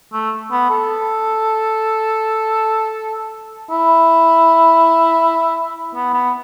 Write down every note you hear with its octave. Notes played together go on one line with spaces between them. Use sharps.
A3
B3
A4
E4
B3
B3